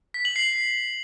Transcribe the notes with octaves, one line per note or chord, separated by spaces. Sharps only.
B6
F#7
C7